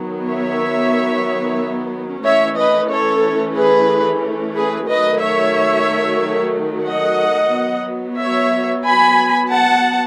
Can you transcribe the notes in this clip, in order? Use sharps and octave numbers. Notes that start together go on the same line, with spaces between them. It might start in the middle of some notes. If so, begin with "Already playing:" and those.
Already playing: D#3 F#3 B3
C#5 E5
E3 A3 C#4 C#5 E5
B4 D#5
A4 C#5
G#4 B4
G#4 B4
D#3 F#3 A3 B4 D#5
C#5 E5
D#5 F#5
F#3 B3
C#5 E5
G#5 B5
F#5 A5